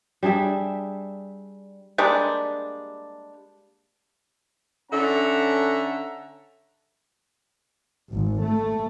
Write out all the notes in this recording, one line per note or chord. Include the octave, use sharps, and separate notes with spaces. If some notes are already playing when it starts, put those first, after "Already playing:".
G3 D4 G#4 E5
G3 G#3 A#3 D4
D3 C#4 A4 E5 F#5 A#5
G#1
A3